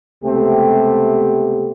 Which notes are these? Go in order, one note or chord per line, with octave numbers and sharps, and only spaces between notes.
C#2 C3 A3 B3 C4 G4